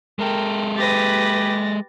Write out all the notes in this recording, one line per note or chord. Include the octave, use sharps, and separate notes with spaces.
G#3 A4 A#4 G5
G4 B4 A6 A#6